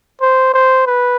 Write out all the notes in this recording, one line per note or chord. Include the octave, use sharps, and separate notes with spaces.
C5
C5
B4